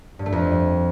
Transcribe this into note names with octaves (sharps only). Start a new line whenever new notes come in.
G2
A3
F2